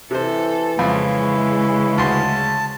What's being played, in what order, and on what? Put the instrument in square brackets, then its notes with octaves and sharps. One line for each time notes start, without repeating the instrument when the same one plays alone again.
[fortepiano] C3 C5 [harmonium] E3 [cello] A4
[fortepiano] F2 [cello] C#3 G#3 [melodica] E4
[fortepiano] D2 C6 [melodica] A5